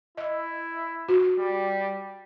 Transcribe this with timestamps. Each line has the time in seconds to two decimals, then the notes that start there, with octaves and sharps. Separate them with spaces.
0.17 E4 D#5
1.09 F#4
1.39 G3